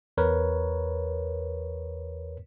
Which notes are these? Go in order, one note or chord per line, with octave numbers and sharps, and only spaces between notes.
E2 A#4 B4 C#5